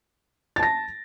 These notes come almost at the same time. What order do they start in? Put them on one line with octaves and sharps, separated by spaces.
A6 A5 A#6